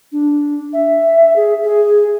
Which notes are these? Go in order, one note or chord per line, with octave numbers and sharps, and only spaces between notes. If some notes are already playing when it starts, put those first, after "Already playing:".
D4
E5
G#4
G#4